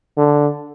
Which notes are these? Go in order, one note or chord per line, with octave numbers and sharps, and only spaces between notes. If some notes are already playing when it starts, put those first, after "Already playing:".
D3